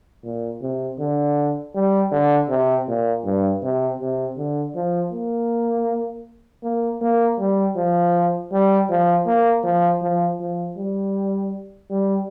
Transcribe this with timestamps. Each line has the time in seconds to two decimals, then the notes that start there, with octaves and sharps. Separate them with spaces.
0.24 A#2
0.62 C3
0.99 D3
1.75 G3
2.12 D3
2.49 C3
2.88 A#2
3.24 G2
3.62 C3
4.00 C3
4.37 D3
4.75 F3
5.13 A#3
6.63 A#3
7.01 A#3
7.39 G3
7.76 F3
8.52 G3
8.90 F3
9.27 A#3
9.64 F3
10.02 F3
10.40 F3
10.77 G3
11.90 G3